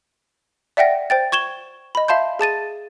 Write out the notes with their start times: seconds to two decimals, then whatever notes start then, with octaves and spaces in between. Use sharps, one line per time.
0.77 D5 E5 F#5 G5 A#6
1.10 C5 G5 A6
1.32 C#6 G#6 E7 G7
1.95 D#5 B5
2.08 E5 F5 A5 C6 G6
2.39 G#4 A5 A6 D#7